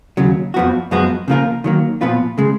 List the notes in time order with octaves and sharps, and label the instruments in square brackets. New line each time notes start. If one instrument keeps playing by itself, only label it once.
[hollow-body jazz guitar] D#2 C#3 F#3
F2 F3 B3 F#4
F#2 F3 G#3 B3 F#4
C#3 F3 A#3 F4 A#4
D#3 F#3 A#3
A#2 F3 B3 F4 B4
C#3 G#3